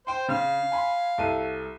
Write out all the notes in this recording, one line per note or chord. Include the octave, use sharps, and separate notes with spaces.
C5 G5 C6
C#3 F5
G#5 B5 C6
C2 A4 D#7